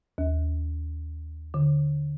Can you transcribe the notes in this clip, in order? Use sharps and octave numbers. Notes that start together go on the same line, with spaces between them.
D#2
D3